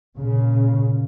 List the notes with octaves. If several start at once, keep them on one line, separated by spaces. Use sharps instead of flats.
A#2 C#3